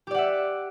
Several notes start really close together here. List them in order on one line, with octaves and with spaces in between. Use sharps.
G4 D5 F#5 E5